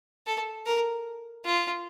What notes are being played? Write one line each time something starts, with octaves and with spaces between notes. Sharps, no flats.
A4
A#4
F4